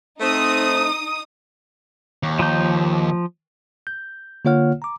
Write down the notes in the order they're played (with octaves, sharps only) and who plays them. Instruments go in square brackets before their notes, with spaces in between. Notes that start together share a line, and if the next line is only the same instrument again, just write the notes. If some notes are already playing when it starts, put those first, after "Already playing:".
[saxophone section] A3 C4 [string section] D#4 D#6
[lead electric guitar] D#2
[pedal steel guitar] F3 A#5 G6
[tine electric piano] G6
D3 A#3 F4 C#5 F#5 F6
A#5 D6